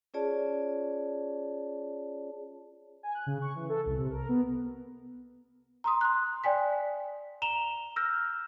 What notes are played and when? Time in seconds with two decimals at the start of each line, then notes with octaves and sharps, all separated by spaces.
0.14 C#4 F4 G#4 C#5 D5 A5
3.03 G#5
3.15 F#6
3.26 C#3
3.41 C#6
3.55 E3
3.69 A4
3.86 C2
3.97 C3
4.10 A#4
4.29 B3
5.84 A#5 C6 D#6
6.01 C6 F#6
6.44 D5 G5 G#5 B6
7.42 A#5 E7 F7 G7
7.96 E6 F6 G6 A#6